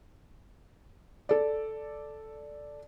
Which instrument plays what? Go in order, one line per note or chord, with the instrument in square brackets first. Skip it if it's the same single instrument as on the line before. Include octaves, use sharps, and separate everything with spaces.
[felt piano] A4 D5